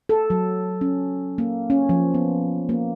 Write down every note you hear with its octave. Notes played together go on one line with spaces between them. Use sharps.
A4
F#3
C#4
A#3
C#4
F3
B3
A#3